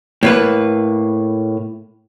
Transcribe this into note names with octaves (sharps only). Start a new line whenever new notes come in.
A2 A#3 B4